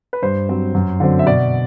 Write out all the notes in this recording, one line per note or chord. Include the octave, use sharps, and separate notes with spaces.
B4
G2 C5
F#3 C4
F#2
D3 F#3 C4
E5
B2 D5